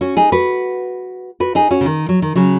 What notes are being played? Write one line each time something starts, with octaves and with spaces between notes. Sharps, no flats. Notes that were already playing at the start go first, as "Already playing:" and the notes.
C#4 F#4
D#4 G#4
F#4 B4
F#4 B4
D#4 G#4
C#4 F#4
C#3
D#3
F#3
D#3
C#3 F#3